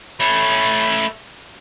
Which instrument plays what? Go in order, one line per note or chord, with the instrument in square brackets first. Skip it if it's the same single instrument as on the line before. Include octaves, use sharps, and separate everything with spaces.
[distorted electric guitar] A3 C#4 [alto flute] B5